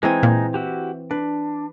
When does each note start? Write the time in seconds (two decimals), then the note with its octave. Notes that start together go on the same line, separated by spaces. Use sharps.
0.03 E3 G#3 C4 D#4 G#5
0.23 A#2
0.54 E4 F#4 G4
1.11 D4 B4